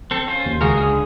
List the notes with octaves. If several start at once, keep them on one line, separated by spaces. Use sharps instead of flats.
C4 A4
C#4 F4 C5
D#2
C#2 F#4 G#4 A#4 F5
D3 G#5 D#6